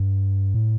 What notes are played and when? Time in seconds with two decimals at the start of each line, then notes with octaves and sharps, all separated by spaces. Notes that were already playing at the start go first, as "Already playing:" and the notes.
Already playing: G2
0.54 A2